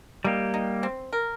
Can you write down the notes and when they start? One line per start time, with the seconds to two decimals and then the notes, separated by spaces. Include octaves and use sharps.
0.24 G3 A#3 D#4 G4
0.54 D#4
0.83 C4
1.13 A#4